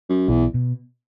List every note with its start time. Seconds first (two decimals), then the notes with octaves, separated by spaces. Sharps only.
0.09 F#2
0.28 B1 E2 B2
0.54 B2